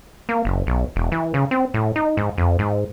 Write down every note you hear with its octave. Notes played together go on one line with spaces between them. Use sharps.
A#3
F#1
B1
E1
E3
C#3
C4
A2
D#4
G#2
F2
G#2